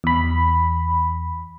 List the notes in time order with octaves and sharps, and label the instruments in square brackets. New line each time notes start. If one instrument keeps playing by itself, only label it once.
[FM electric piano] E2 B5